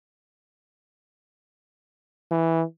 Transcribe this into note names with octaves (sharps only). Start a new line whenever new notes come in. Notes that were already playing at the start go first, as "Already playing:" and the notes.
E3